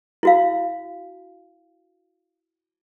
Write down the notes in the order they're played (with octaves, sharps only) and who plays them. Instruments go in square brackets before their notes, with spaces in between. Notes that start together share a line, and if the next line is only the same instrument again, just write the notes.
[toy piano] E4 F#4 F5